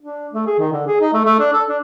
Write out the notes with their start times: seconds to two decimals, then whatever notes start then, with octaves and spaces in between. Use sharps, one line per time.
0.03 D4
0.33 A3
0.46 G#4
0.59 D#3
0.72 D3
0.87 G#4
1.01 D#4
1.13 A3
1.25 A3
1.40 D4
1.53 A4
1.69 D4